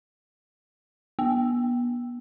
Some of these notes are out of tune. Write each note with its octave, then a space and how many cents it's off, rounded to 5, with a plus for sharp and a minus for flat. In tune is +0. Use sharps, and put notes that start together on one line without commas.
B3 -30